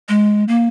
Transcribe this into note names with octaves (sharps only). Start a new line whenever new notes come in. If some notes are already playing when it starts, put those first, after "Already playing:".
G#3
A#3